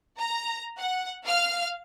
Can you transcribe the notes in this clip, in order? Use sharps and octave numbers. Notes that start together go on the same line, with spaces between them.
A#5
F#5
F5 F6